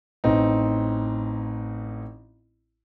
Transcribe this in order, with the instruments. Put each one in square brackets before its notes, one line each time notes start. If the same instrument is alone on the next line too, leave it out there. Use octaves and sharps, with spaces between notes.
[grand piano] A1 C4 D#4